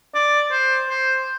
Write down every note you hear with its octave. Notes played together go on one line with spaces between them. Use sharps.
D5
C5
C5